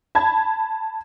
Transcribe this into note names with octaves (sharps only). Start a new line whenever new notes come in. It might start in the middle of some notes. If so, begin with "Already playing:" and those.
A5 B5 G#6